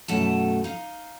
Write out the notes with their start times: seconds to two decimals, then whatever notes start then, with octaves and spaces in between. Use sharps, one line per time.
0.08 F#2 B2 A3 D#4 A5
0.64 D#4 F5